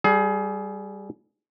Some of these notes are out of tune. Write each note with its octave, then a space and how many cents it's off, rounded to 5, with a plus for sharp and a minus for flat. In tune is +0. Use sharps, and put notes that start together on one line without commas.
G3 +0 G#4 +30